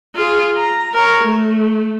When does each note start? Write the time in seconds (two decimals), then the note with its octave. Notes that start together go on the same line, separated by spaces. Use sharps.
0.16 F4 G#4
0.58 A#5
0.94 A#4 C#5
1.24 A3